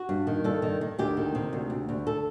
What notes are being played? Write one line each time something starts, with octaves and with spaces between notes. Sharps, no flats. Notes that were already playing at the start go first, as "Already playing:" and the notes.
Already playing: F#4
G2
D#3
G2 A4
D#3
D#3
D2 G4
D#3
C3
D2
D2
D2
A4